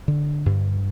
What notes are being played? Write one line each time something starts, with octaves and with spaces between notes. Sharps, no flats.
D3
G2